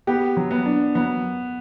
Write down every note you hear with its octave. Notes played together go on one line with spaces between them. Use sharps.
B3 G4
F#3
B3
D4
F#3 B3